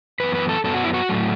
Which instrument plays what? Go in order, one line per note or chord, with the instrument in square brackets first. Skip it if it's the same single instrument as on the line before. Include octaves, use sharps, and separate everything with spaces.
[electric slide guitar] F#2 E3 B3 B4
B4
A4
F#2 F#3 B3 A4
F#4
E4
F#4
A2 F#3 A3